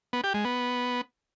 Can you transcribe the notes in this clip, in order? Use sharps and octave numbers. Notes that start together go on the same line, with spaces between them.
B3
G4
G#3
B3